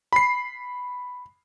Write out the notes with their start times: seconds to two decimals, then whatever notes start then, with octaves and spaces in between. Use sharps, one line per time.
0.13 B5 C7